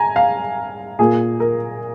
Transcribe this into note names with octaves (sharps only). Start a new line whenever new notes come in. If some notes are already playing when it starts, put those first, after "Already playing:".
Already playing: G#5 A#5
F5
A#2 A#3 G#4
A#4